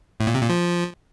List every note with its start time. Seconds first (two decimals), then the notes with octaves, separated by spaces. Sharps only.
0.20 A2
0.27 A#2
0.35 C3
0.42 A#2
0.49 F3